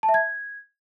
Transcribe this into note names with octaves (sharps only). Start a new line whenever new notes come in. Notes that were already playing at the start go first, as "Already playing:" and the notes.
A5
E5
G#6